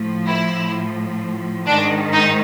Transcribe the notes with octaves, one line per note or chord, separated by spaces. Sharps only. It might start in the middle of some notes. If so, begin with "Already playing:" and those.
Already playing: A2 F3
E4
G#2 D#3 D4
D#4